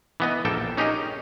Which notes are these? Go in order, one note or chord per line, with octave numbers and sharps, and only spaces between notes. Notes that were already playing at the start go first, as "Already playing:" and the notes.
E3 B3 D#5
A#1 A#3 A4 G5
C#4 D#4 G4 G#4 A#4 D#5